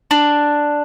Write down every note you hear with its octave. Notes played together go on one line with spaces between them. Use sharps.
D4